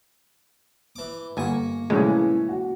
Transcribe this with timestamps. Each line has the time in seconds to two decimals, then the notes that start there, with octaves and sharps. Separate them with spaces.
0.96 E3 D6
1.37 G1 A#3 G#5 C#6
1.90 C2 A2 C#3 E3 G#3 C#4
2.49 F#4